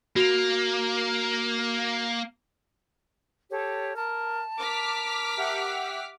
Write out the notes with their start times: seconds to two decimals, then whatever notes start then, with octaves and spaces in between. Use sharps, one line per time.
0.16 A#3 F#4 F7
3.50 G4 A4 C#5
3.96 A#4 A5
4.59 A#4 D6 F6 B6
5.37 G4 E5 F#5